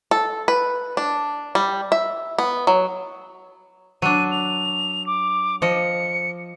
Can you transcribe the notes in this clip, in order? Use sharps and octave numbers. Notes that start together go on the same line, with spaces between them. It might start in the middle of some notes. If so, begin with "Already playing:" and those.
A4
B4
D4
G3
E5
B3
F#3
F#3 D4 D#7
F7
D6
F3 D#5 C#7